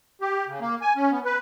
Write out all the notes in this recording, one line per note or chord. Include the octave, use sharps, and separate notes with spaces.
G4
C#3
A#3
G#5
C#4
B3
B4